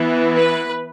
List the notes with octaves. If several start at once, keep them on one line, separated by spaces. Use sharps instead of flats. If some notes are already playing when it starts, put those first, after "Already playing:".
Already playing: E3 B3
B4